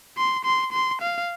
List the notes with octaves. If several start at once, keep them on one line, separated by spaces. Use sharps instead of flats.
C6
C6
C6
F5